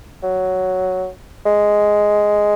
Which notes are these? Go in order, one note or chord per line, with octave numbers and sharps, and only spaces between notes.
F#3
G#3